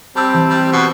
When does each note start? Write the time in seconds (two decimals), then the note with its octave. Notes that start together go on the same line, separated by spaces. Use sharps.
0.16 G3 C4 A5 D6 E6
0.34 E3
0.49 G3
0.72 B2